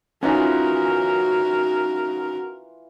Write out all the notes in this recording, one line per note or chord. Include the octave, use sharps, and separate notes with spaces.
E3 C#4 D#4 F4 F#4 A#4 F#5